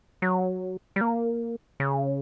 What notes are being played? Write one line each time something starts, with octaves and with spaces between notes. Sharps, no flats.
F#3
G3
A#3
C#3